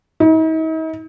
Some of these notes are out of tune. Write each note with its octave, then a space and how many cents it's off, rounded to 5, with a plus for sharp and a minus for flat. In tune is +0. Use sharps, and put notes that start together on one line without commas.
D#4 +45